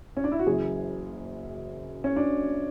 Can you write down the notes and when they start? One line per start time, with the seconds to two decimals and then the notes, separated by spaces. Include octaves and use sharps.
0.17 C#4
0.24 D4
0.32 E4
0.39 F#4
0.46 F#1 F#2 E3 G#4
2.04 C#4
2.16 D4